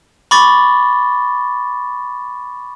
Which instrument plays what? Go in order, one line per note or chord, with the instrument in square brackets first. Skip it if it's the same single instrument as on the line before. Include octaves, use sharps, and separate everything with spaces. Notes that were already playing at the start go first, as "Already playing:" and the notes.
[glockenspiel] B5 C#6 D6 A6